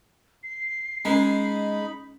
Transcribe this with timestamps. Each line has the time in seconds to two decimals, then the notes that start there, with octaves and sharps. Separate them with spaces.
0.43 C7
1.05 G#3 C#4 D#4 A#4 B5